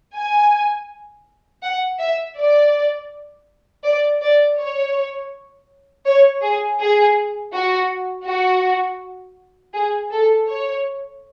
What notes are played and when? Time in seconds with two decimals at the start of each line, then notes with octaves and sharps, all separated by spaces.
0.15 G#5
1.62 F#5
1.99 E5
2.37 D5
3.83 D5
4.21 D5
4.58 C#5
6.05 C#5
6.42 G#4
6.79 G#4
7.53 F#4
8.26 F#4
9.74 G#4
10.11 A4
10.48 C#5